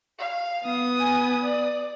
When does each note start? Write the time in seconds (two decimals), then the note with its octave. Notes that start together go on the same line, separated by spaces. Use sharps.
0.19 F5
0.64 B3 D#6
0.99 G#5
1.43 D5